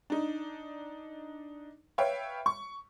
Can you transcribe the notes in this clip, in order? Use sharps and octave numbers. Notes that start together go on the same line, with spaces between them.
D4 D#4
B4 C#5 E5 F5 G5
C#6